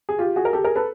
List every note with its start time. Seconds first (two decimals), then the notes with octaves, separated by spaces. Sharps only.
0.09 G#4
0.19 F4 G4
0.36 F#4 G#4
0.45 A#4
0.53 G4 A4
0.64 G#4 A#4
0.76 A4 B4